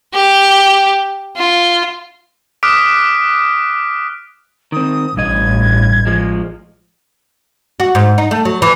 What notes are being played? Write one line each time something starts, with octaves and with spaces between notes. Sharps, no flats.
G4
F4
D6 D#6 F6 F#6 B6 D7
D#3 C4 D#6
A1 G2 D#5 G#6
F3 G#3
F#4
G#2
D#4
A3
F#3
E3